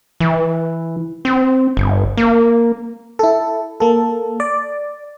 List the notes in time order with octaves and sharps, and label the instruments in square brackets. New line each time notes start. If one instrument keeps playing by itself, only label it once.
[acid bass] E3
C4
G1
A#3
[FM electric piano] E4 A4
A#3 A4
D5